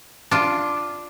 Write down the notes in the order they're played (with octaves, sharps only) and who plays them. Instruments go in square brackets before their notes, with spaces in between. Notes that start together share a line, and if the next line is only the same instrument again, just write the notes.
[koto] D4 F4